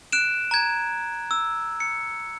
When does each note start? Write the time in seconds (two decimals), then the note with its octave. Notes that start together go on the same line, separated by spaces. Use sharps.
0.12 F#6 D7 E7
0.51 A#5 G#6
1.31 E6
1.80 C#7